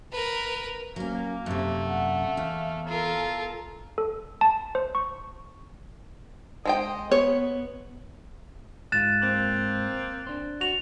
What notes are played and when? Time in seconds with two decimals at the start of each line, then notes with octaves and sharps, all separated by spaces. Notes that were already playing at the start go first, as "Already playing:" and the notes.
0.12 A#4 B4
0.96 F#3 A#3 C#4
1.46 F#2 C3 A3
1.85 F#5
2.37 E2 F5
2.88 F4 A4 A#4
3.98 A4
4.41 A5
4.75 C5
4.95 C#6
6.65 G#3 C5 D#5 G5
7.11 B3 C#5
8.92 G#2 G#3 F4 F#6 A6 E7
9.22 A#3 C4
10.27 D4 C5
10.61 F#4 F7